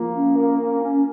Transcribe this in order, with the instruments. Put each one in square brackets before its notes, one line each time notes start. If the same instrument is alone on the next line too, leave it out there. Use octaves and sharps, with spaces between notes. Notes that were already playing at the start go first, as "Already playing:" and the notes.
Already playing: [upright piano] F3 [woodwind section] A#3
[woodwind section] C#4
A#3
C#4
C#4